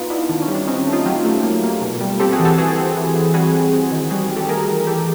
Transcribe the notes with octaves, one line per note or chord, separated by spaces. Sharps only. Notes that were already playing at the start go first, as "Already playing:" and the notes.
Already playing: B3 D#4 F4
B3 D4 E4
D#3 D4
C#4
G3
D4
C4 C#4 D#4
A3
D#4 F4
F#3 F4 G4
A3
A#3
A#3
B2
G3
C4 G4 A4
F#4 G#4
E3
G4 A4
E3 F#4 G#4
C4
E3
E3
G3 F#4 G#4
E3
C4
D#3
G3 F#4 G#4
G3
G4 A4
A3 G#4 A#4
E3
E3 G4 A4